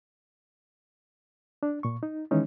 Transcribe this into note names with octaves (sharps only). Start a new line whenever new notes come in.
D4
A#2 C#6
D#4
D#3 E3 G#3 C#4 D#4